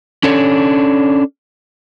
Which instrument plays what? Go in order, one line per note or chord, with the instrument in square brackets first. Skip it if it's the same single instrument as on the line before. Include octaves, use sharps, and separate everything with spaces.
[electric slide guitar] C#4 D4 A4 C#5